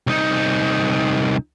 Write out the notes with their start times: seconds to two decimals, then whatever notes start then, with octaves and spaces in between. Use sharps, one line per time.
0.07 C2 D#4